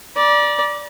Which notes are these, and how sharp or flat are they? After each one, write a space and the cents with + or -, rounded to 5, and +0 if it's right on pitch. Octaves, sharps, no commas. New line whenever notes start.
D5 +0 A#5 +45